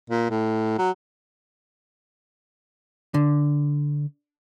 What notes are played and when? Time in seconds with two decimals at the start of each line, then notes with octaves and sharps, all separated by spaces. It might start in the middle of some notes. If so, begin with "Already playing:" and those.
0.10 A#2
0.30 A2
0.78 F#3
3.14 D3